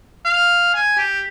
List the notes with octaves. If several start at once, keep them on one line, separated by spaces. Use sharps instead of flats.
F5
G#5
G4